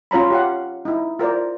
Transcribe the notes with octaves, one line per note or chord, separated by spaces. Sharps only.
C#4 F4 C#5 A#5 B5
G4 F5 F#5
D#4 E4
F4 A#4 C5 D5